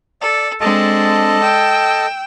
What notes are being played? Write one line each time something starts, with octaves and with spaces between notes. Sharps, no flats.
A4 D5
G#3 C4 D4 A4 D#5 A5
G5 E6